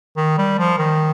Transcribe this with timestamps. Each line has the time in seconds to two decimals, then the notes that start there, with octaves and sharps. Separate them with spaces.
0.17 D#3
0.38 G3
0.58 F3
0.78 D#3